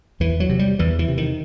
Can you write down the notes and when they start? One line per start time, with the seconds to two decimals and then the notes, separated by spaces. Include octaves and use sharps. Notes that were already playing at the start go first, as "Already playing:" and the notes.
0.20 E2 E3
0.40 F#3
0.49 C3
0.59 G3
0.79 E2 E3
0.99 E3
1.08 C3
1.18 D#3